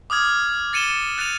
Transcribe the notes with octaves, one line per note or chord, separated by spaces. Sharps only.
D6 D#6 F6 G#6
A6 C#7 D#7 E7 G7
F#6 A6 C#7 D#7 F7